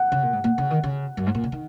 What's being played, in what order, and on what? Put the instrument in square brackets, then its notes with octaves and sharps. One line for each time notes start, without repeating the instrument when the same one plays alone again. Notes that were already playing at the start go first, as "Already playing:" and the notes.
Already playing: [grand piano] F#5
[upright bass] C#3
A#2
G#2
A#2
C#3
D#3
C#3
F#2
G#2
A#2
C#3
D#3